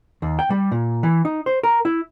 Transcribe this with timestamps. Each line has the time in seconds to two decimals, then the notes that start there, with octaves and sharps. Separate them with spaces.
0.22 D#2
0.39 G5
0.50 G3
0.72 A#2
1.03 E3
1.25 D#4
1.46 C5
1.63 A#4
1.85 E4